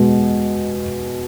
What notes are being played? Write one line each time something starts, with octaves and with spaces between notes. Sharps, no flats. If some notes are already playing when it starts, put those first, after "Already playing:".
Already playing: B2 G#3